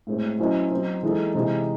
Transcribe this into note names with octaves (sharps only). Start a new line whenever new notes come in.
A2 G#3 C4
F#3 C#4 E4 C5 D#5
F#3 C4 D#4
E3 G#3 D#4 A4
C3 E3 G#3 C4 D#4